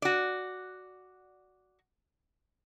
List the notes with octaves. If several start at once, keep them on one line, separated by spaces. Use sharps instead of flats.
F#4 D5